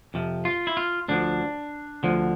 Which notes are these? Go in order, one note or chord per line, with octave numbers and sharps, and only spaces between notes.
F2 C3 F3
F4
E4
F4
D2 D3 F3 D4
D2 D3 F3